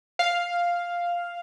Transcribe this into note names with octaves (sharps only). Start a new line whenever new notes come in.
F5